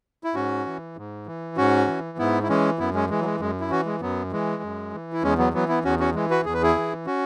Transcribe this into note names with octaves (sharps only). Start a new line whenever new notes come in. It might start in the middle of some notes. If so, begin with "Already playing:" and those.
E4
G#2 C#4 F#4
E3
G#2
E3
G#2 C#4 F#4
E3
G#2 B3 E4
E4
E3 G#3 C#4
F#2 B3 E4
G#3 C#4
E3 G#3
F#3
G#3
F#2 G#3
E4
E3 C#4 F#4
G#3
F#2 F#3 B3
E3 G#3
F#2
E3
E4
E2 G#3 C#4
F#3 B3
E3 F#3 B3
B3 E4
E2 C#4 F#4
C#4 F#4
E3 G#3
F#4 B4
E2 G#4
B4
E4 G#4
E3
C#4 F#4